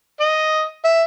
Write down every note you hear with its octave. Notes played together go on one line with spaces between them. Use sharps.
D#5
E5